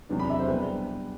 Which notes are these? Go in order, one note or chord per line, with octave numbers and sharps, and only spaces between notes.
E2 C3 F#3 B3 D4
B5
E5
C5
B2 G3 D4 B4